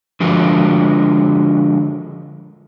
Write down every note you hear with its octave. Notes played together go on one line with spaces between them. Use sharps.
D3 F3 G#3 F#4 A#4